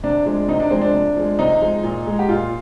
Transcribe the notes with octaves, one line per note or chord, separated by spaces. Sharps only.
C3 D4
F3 G#3 D4
C3 D#4
D4
F3 G#3 C4
D4
C3
F3 G#3
C3 D#4
F3 G#3
A#2
G#3
G4
A#2 F4